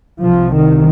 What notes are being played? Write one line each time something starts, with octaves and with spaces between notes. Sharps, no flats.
C2 C3 F3
D#3